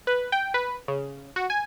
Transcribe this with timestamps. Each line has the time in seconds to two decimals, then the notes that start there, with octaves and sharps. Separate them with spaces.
0.07 B4
0.32 G5
0.54 B4
0.88 C#3
1.36 F#4
1.50 G#5